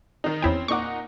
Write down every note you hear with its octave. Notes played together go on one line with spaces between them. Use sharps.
D#3 D#4
E2 C4 C#4 E4 G5
A#2 D#4 F#5 C#6 D6